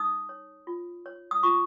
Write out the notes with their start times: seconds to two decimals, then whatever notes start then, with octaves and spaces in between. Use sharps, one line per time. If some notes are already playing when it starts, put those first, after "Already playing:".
Already playing: D#4 D#6
0.29 C#5
0.67 F4
1.06 C#5
1.31 D#6
1.43 F4 C#6